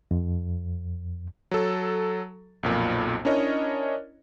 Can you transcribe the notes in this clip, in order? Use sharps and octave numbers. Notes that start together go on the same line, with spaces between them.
F2
F#3 A4
B1 F2 A#2
C#4 D4 E4 A#4 C#5 D#5